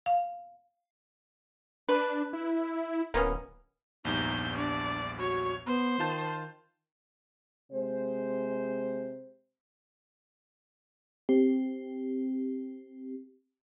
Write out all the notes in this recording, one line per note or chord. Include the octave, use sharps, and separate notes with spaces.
F5
D4 B4
E4
D1 A#3 B3 C#4
A#1 E2 G2 D#4 G6
D4 D5
F#4 C#5
B3 C5
D#3 F4 A5 G6
C3 G#3 C5
C4 G4